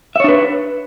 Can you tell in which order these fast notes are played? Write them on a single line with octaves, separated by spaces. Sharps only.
E5 C#5 D4 B4